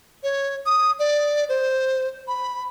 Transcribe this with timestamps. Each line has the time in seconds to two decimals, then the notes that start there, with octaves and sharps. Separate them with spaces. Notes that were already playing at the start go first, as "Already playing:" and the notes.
0.23 C#5
0.66 D#6
0.99 D5
1.49 C5
2.28 B5